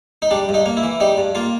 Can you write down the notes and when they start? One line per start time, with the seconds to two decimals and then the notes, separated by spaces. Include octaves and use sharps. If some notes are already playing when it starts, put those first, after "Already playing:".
0.22 D#4
0.31 G3 D4
0.49 G2
0.54 D#4
0.66 A#3
0.77 E4
0.83 E3
1.00 G3 D#4
1.18 G2
1.35 A#3 F4